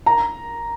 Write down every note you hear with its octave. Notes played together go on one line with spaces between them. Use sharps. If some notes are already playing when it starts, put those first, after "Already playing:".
A#5